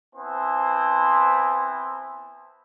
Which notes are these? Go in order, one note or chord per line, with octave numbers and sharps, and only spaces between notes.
B3 C4 E4 C5 G#5 A5